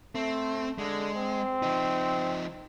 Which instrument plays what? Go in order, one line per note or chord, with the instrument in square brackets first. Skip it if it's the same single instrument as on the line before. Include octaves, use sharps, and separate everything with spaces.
[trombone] A3 [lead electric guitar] C4
[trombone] D3 [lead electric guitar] G#3
[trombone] C4
[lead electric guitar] F3 D#4